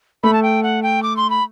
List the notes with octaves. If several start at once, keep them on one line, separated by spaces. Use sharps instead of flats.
A3 B5
A5
G5
F#5
G5
D6
C6
B5